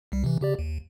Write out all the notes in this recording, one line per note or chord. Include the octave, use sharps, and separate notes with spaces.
C2 G3
C3 E3
C#3 G4 D5
D#2